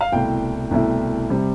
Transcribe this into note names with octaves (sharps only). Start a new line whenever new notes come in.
F5
C2 B2 A3 E4 G5
C2 B2 A3 E4
C3 G3